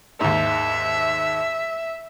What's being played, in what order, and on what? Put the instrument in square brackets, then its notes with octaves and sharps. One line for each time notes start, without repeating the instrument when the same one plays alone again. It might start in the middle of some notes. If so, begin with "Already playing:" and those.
[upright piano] D#2 G#2 [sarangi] E5